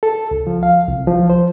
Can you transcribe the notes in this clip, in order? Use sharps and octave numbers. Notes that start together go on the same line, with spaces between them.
A4
C#2
F3
F5
C2
F3
C5